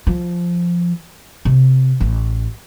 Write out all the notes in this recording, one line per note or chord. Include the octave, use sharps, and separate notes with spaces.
F3
C3
A1